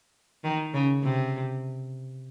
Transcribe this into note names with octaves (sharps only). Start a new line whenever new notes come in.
D#3
C#3
C3